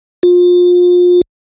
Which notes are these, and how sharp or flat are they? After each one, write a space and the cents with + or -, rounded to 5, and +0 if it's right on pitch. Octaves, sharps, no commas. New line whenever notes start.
F4 +30